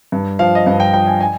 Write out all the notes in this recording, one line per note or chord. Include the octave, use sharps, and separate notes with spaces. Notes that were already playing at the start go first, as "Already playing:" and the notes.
G2
F3 F5
D#5
G2 F5
G5
F3 G5
G#5
G#5